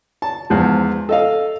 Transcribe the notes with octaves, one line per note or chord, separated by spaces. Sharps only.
A5
E2 G#2 F3 F4
A4 D#5 F5